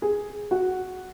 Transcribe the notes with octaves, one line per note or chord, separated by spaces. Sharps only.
G#4
F#4